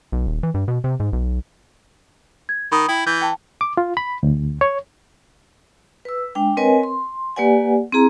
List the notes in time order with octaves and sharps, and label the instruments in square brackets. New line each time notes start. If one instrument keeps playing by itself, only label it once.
[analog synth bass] B1
D#1
E3
G2
B2
C3
G#2
B1
[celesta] G#6
[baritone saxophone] D#3 [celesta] B5 D#6
[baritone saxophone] E4 [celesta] G5
[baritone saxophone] E3 [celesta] G6
[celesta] G5 A5
[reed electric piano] D6
F4
B5
D2
C#5
[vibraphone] B4 E6
G#3 D4 G5
C4 A#4 B4 C#5 D#5 G#5
C6
A#3 G4 B4 D5 F#5 G#5
C4 E4 G#4 A#5